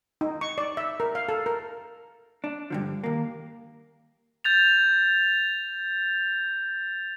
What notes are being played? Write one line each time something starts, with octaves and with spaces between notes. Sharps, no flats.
D#4
C#6
D5
E5
A#4
F5
A4
A#4
D4
G2 D3 F3
D#2 A#3
G6 A6 F7